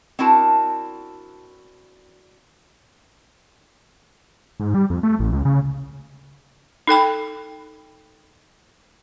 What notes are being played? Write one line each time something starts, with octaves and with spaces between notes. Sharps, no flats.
C4 D4 E4 F#4 A#4 A5
G#2
G3
F2
A3
A1
C#2
C#3
D#4 A4 G5 B5